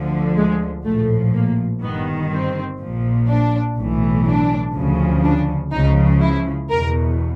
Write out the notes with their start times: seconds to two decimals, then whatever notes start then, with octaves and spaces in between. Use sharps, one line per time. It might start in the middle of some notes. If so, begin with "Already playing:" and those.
Already playing: D2 D3 F3
0.37 G#3
0.85 A#1 A2 F3 A3
1.34 A#3
1.82 G1 G2 D#3 B3
2.31 C4
2.80 A#1 A#2 F3
3.29 D4
3.77 B1 A2 E3
4.27 D4
4.75 D2 C#3 F3
5.24 D4
5.72 C#2 C#3 F3 D#4
6.21 E4
6.70 E2 B2 A#4